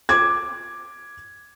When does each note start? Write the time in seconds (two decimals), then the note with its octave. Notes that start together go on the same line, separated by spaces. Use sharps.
0.09 D6 G#6